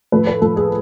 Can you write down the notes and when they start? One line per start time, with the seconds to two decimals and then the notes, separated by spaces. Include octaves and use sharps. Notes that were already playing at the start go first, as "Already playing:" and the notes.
0.12 A2 F3 A3 B4
0.27 B4
0.41 A2 F3 A3 A4
0.56 G#4